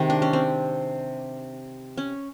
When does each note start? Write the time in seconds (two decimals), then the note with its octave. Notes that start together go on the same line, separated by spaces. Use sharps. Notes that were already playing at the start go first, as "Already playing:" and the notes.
Already playing: C3 D#3 G#3
0.10 D4
0.22 C#4
0.33 C4
1.98 C#4